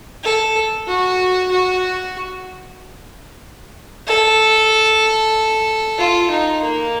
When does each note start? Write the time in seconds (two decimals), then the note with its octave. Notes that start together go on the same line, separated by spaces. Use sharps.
0.23 A4
0.87 F#4
1.51 F#4
4.07 A4
5.99 F4
6.30 D#4
6.62 A#3